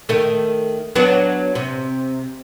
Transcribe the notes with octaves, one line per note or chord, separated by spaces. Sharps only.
D#3 A3
F#3 B3 D4
C3